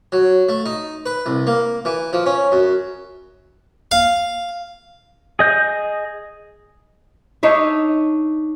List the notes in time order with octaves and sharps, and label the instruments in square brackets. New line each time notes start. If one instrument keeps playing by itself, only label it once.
[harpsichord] F#3
A3
D#4
B4
C2
A#3
E3
F3
C#4
F#2
F5
[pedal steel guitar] G#4 D#5 G6
[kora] D4 D#4 C#5 E5